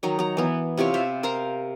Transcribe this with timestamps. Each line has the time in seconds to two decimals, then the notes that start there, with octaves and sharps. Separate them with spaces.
0.03 D#3 F#3 D#4
0.19 F#3 A#5
0.37 E3 B3
0.78 C3 E4 F4 C#5
0.94 C5 E5 F5 A5
1.23 A#4 C5 F5 A#5